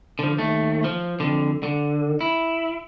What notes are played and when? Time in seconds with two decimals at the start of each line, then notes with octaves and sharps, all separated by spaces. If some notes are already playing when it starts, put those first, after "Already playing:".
0.19 D3 F3
0.38 D#2 A3
0.84 F3
1.20 F2 D3
1.63 D3
2.21 E4